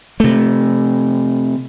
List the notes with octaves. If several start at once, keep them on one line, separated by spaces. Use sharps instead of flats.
C3 A3